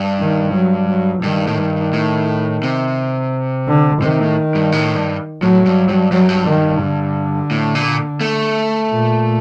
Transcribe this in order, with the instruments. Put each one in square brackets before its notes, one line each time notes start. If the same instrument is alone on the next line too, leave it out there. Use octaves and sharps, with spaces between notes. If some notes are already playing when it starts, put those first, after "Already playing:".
Already playing: [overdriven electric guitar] G2
[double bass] D#3
F#3
F#3
[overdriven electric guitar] G2 [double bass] D#3
[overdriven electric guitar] A2
G2
A2
C3
[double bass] D3
[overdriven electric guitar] C3 [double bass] D#3
[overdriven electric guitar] A2
G2
A2
G2
[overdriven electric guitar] A2 [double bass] F#3
[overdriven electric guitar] G2
G2
[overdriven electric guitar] G2 [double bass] F#3
[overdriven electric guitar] F#2
G2
[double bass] D#3
D3
[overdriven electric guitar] A2
A#2
A3
[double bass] A#2